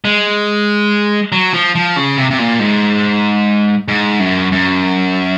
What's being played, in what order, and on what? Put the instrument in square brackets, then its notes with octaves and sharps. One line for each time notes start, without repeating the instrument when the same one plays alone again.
[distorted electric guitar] G#3
F#3
F3
F3
C#3
C3
C3
A#2
G#2
G#2
F#2
F#2